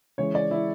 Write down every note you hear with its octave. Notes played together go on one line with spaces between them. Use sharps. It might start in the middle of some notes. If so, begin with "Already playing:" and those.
C#3 E3 G#3 C#5
D5
E4